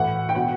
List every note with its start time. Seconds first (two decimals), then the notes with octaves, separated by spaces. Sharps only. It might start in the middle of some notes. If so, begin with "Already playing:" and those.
Already playing: A2 E3 F#5
0.29 G5
0.35 B2 F#5